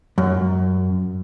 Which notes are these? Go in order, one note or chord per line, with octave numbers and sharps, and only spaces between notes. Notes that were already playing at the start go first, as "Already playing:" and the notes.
F#2